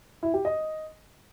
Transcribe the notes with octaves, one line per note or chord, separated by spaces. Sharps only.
E4
G4
D#5